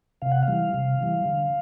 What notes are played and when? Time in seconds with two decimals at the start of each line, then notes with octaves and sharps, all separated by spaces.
0.22 C3 F5
0.32 F#5
0.43 F5
0.48 E3 G3
0.74 C3
1.00 E3 G3
1.26 D3